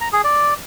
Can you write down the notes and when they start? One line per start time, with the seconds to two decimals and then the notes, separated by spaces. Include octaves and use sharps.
0.01 A#5
0.12 G#4
0.24 D5